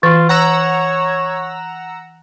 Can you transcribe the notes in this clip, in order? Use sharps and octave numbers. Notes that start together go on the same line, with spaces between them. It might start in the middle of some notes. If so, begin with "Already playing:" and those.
E3 F4
C#5 F#5 A#5 E6